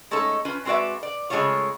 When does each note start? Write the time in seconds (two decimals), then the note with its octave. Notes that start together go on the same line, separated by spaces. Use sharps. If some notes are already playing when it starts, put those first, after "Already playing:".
0.11 G#3 A3 C#4 D#4 A4
0.45 C#4 F4 B4
0.65 G#3 C4 F#4 B4 D5 E5
1.03 D5
1.30 C#3 G#3 A3 C#4 F4 C#5